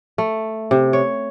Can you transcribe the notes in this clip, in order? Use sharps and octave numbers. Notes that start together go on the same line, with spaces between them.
A3
C3
C#5